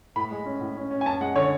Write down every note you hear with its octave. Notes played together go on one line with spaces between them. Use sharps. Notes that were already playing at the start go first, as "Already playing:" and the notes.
A2 B5
G#3
C#4
A2
C#4
C#4
G#5
F#2 A5
G#3 F#5
D3 C#5